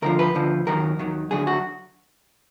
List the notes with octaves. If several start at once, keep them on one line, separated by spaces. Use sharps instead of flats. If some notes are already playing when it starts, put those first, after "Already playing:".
D2 D3 F3 A#4
B4
D2 D3 F3
D#2 D#3 F#3 A#4
D#2 D#3 F#3
D2 D3 F#3 G#4
F#4